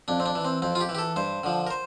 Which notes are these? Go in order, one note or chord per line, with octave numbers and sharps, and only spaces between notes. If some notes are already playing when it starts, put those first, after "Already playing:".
F2 D4
C4
D4
E3
C4
F2 C4
F4
G4
E3
G4
A4
G2 C5
D3 F3
A#4
C5